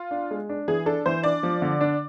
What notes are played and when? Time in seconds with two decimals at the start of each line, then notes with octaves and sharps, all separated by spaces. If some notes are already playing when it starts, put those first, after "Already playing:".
Already playing: F4
0.11 D4
0.31 G#3
0.49 D4
0.68 E3 G#4
0.86 D4 A4
1.06 E3 C5
1.23 D4 D5
1.43 F3
1.62 D3
1.81 D4